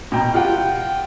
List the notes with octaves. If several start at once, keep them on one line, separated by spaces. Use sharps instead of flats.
B2 G5 A#5
F4 G4 F#5 G5